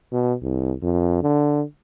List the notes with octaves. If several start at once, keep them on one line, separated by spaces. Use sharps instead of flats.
B2
C2
F2
D3